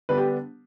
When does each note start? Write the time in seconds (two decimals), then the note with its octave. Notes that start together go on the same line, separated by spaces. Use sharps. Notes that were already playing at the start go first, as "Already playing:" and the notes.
0.09 D3 G3 B3 D4 B4
0.18 G4